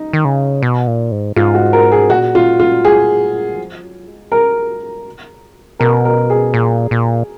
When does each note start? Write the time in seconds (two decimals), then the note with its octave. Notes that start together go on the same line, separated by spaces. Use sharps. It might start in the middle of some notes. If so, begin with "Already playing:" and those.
Already playing: D#4
0.13 D#3
0.25 C#3
0.62 B2
0.87 A#2
1.12 G#2
1.36 G#2 F4
1.54 F#4
1.73 A#4
1.92 G#4
2.10 A#2 F#4
2.35 F4
2.60 F4
2.85 G#4
3.54 D#3
3.58 F3
3.83 F#3
4.08 G#3
4.32 F#3 A#4
4.57 G#3
4.81 F#3
5.06 D#3
5.30 C#3
5.56 B2
5.79 B2 A#4
6.05 A#4
6.30 G#4
6.54 A#2
6.91 A#2